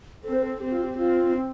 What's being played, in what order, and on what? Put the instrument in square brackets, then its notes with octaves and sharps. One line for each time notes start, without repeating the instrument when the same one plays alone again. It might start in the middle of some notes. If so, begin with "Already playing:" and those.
[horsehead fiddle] C4 [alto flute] A4
[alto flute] C5
A4
[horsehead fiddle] C4 [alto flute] G4
[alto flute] F4
G4
[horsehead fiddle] C4 [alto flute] F4
[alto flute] C4